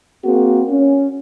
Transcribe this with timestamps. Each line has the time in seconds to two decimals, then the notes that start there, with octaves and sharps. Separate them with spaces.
0.24 A#3 C4 F#4 G#4
0.67 C#4